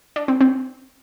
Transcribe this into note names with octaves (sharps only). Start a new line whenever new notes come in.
D4
C4
C4